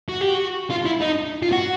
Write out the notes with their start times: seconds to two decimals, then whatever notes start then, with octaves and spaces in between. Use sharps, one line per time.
0.09 F#4
0.21 G4
0.34 F#4
0.70 F4
0.86 E4
1.01 D#4
1.43 F4
1.52 F#4